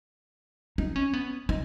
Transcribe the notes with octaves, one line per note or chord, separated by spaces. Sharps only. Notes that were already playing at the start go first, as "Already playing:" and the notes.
D#4
C#4
B3
D#4